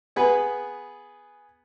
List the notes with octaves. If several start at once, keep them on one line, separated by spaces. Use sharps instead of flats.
B3 G#4 B4